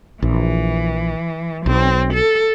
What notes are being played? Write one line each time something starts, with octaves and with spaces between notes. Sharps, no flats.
A#1 E3
B1 C4
A4